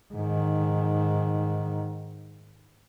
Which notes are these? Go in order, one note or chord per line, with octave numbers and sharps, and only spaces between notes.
G#2 D#3